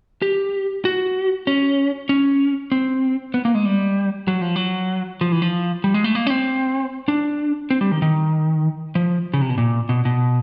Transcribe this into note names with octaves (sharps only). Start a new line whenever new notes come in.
G4
F#4
C#4
C#4
C4
B3
A#3
G#3
G3
F#3
F3
F#3
F3
E3
F3
G3
G#3
A3
A#3
C#4
C4
D4
C4
G3
D#3
D#3
F3
C#3
C3
B2
A#2
B2
B2